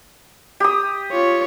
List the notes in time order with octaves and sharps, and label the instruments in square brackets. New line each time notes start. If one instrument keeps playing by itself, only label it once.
[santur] G4 D#6
[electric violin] F4 C#5